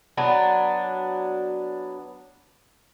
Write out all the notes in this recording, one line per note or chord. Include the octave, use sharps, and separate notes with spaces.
F#3 B3 D4